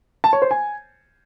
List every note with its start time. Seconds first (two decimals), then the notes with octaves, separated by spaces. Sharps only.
0.24 A5
0.33 C#5
0.42 C5
0.51 G#5